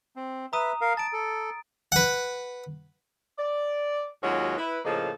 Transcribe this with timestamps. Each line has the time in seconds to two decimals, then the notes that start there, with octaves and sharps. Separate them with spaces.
0.16 C4
0.53 B4 E5 A#5 D#6 D#7
0.81 A#4 F5
0.97 A5 A6 D7
1.13 A4
1.92 B4 F#5
3.38 D5
4.23 D#2 F#3 G#3 C#4 F4 F#4
4.57 E4 B4
4.85 A2 C#3 F3 A#3 A4 D#5